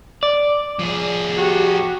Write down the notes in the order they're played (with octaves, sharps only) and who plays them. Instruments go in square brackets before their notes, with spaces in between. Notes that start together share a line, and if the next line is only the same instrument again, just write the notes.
[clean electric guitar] D5
[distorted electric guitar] F3 G#4
[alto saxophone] F#4 [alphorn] G4